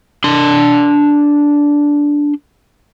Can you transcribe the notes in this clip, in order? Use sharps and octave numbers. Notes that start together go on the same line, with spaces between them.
D4 C6